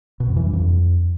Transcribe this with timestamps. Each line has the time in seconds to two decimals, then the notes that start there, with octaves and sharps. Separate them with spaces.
0.20 B2
0.28 F2
0.37 E3
0.45 G2
0.53 F2